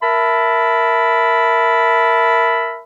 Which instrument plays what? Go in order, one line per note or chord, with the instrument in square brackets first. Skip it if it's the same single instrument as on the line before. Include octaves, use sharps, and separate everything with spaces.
[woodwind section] A#4 E5 A5 B5